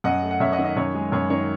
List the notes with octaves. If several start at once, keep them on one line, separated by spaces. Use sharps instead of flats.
F#2 D#5 F#5
A3
F#5
F#2 C#5 E5
D#5 F#5
D#3
D#5
F#2 C#5
G#3
F#2 C#5
D#3 C#5